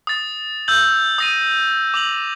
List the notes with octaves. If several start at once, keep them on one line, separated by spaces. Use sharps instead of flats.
D#6 A6
E6 G6 F#7
D#6 A#6 D#7
D6 F7 F#7